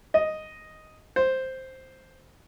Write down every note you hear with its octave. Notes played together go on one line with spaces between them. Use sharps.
D#5
C5